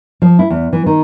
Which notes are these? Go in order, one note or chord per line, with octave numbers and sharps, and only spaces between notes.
F3
E4
E2
E3
D#3